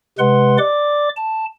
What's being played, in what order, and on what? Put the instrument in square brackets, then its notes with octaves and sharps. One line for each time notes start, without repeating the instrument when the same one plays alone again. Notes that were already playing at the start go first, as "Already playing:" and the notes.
[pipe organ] C3 G#3 B4 F#5 C6
D5 D6
A5